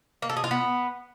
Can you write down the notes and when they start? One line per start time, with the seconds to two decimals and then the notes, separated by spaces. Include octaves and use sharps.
0.22 A#3
0.29 A4
0.37 G#4
0.44 F4
0.51 B3